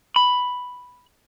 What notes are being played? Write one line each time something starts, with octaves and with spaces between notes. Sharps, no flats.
B5